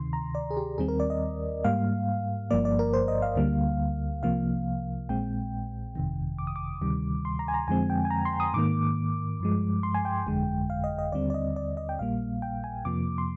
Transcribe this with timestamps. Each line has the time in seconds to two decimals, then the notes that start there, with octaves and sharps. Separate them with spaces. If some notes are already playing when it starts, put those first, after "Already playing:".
Already playing: D2 C3 D#3 C6
0.13 A#5
0.35 D5
0.51 G#4
0.57 G4
0.78 D#2 D#3 G3 C4 G#4
0.88 A#4
1.00 D5
1.10 D#5
1.64 G#2 G3 A#3 F5
2.51 G1 G2 F3 A#3 D5
2.65 D5
2.79 A#4
2.94 C5
3.08 D#5
3.22 F5
3.36 D2 D3 G3 A#3
4.23 C2 C3 F3 A#3 F5
5.09 A#1 A#2 G#3 C4 G5
5.95 G1 F2 C3 D#3
6.39 D6
6.47 D#6
6.56 D6
6.81 D2 C3 D#3 G3
7.25 C6
7.39 A#5
7.48 G#5
7.54 A#5
7.68 F2 D3 F3 G#3 C4 G#5
7.90 G5
8.05 G#5
8.10 A#5
8.25 C6
8.40 D#6
8.54 G#2 D#3 A#3 D6
9.40 G2 F3 G#3
9.83 C6
9.95 G#5
10.05 G5
10.27 G1 F2 D3 G#3
10.70 F5
10.84 D#5
10.98 D#5
11.12 D#2 D3 G3 C4 D5
11.30 D5
11.34 D#5
11.56 D5
11.77 D#5
11.89 G5
11.99 A#1 A#2 G3 A#3 F5
12.42 G5
12.64 G#5
12.85 F2 C3 F3 A#3 D6
13.18 C6